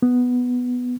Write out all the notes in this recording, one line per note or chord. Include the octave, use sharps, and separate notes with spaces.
B3